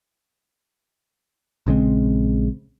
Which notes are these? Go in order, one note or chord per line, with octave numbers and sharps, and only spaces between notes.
A#1 C#3 G#3 C4